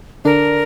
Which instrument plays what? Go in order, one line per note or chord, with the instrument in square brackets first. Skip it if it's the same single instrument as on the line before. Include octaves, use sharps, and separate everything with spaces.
[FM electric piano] D3 D4 [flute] A#4